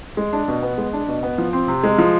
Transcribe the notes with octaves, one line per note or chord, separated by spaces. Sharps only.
G#3
D4
B2
B3
G#3
D4
B2
B3
F3
C4
C3
G#3
F3